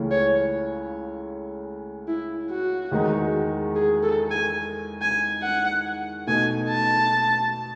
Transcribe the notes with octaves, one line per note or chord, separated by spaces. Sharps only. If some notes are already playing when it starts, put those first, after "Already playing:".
Already playing: C#2 C#3 E3 A3 C#4
C#5
E4
F#4
E2 D#3 G#3 D#4 F#4
G#4
A4
G#5
G#5
F#5
B2 A3 D#4 G#5
A5